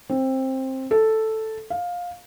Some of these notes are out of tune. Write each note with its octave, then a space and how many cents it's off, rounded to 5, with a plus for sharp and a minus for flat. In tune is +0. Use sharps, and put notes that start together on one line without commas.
C4 +15
A4 +0
F5 +15